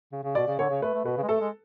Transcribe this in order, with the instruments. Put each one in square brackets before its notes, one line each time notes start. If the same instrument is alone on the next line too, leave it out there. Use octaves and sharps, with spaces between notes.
[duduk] C#3
C#3
[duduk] B2 [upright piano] D5
[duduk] C#3
[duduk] D3 [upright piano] C#5
[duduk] C#3
[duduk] A3 [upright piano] B4
[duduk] A3
[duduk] B2 [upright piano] B4
[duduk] C#3
G#3
[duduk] A3 [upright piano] A4
[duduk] G#3